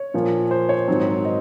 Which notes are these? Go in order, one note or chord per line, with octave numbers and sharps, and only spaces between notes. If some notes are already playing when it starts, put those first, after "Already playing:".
Already playing: C#5
A#2 F3 A#3
C5
C#5
G#2 D#3 F#3 C4
D#5